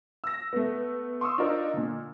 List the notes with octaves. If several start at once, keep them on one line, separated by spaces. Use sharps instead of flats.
E6 A#6
A3 B3
C6 C#6 D#6 E6
D4 D#4 F4 A#4 C5
A#2 D3